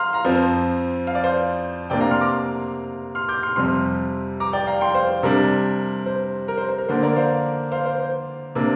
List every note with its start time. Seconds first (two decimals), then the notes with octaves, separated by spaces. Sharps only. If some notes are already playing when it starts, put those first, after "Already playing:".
Already playing: F5 A#5 C6 F6
0.13 F5 A#5
0.25 F2 F3 C4
1.07 F5
1.15 D5
1.24 C5 F5
1.90 C3 A#3 D4 D5 G5
2.01 F5 A#5
2.11 C6 F6
2.21 A#5 D6
3.15 C6 F6
3.28 D6 G6
3.43 C6 F6
3.56 F2 C3 G3 C6 F6
4.40 A#5 D6
4.53 D5 G5
4.67 F5 A#5
4.81 G5 C6
4.95 C5 F5
5.23 C3 G3 D4 A#4
6.06 C5
6.48 A#4
6.57 C5
6.69 C5
6.78 A#4
6.89 D3 A#3 D4 C5
7.03 A#4 D5
7.16 C5 F5
7.72 C5 F5
7.86 C5
7.99 C5
8.55 C3 A#3 D4